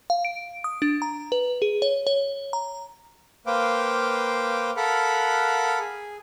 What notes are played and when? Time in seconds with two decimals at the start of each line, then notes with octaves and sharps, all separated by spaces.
0.10 F5
0.25 D7
0.64 D#6
0.82 D4
1.02 A#5
1.32 B4
1.62 G#4
1.82 C#5
2.07 C#5
2.53 A#5
3.46 A#3 B4 C5 F5 G5 D6
4.77 A4 A#4 F5 F#5 B5 F#6
5.79 G#4